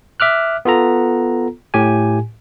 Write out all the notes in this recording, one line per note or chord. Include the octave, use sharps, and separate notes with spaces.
E5 D6 F6 F#6
B3 F4 A4 A#5
A2 G4 G#5